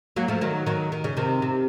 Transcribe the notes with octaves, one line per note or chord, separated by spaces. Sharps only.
F#3 A#3
F3 A3
D#3 F#3
D#3 F#3
D#3
C#3
C3 D#3
C3